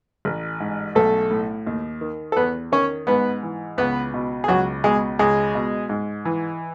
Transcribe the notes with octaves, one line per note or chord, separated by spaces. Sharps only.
A1
G#2
B1 A3 A4
A2
D#2
D#3
A4
E2 B3 B4
D#3 C#4 C#5
G#2 B3 B4
E3
C#2 B3 B4
B2
G#4
C#2 F#3 F#4
B2 G#3 G#4
C#2 G#3 G#4
B2
G#2
E3